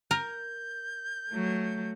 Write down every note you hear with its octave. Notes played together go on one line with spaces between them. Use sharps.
A#4 G6
F#3 A3